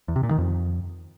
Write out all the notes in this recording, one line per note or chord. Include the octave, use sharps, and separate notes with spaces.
E2
C3
A#2
D#3
F2